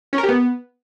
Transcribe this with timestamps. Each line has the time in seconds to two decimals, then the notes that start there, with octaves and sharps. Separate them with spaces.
0.13 C#4
0.18 A#4
0.23 G4
0.29 B3